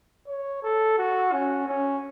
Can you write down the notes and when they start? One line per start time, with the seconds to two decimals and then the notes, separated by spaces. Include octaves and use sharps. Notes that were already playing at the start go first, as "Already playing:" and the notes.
0.28 C#5
0.63 A4
0.98 F#4
1.33 C#4
1.68 C#4